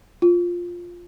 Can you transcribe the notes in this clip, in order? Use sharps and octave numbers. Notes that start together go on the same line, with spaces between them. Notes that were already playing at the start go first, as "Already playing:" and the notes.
F4